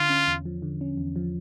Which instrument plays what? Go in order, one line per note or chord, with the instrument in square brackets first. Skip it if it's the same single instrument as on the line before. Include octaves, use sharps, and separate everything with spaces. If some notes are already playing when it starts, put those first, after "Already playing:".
Already playing: [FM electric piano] D3 [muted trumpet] F4
[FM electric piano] C#4
E2
F3
D3
C#4
E2
F3